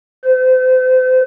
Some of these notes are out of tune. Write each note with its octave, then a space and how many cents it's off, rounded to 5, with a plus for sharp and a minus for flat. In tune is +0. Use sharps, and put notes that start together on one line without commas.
C5 -35